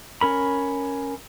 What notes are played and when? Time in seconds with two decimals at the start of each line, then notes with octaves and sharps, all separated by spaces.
0.21 C#4 A#4 B5